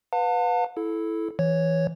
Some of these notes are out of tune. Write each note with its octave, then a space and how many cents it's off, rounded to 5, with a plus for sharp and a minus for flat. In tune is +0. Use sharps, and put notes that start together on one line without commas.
B4 +0 F5 +45 A5 +35
E4 +0 A4 -15
E3 +0 C#5 +0